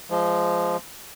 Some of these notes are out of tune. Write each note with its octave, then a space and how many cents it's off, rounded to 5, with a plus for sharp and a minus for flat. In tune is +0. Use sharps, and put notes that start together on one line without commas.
F3 -15 G#3 +0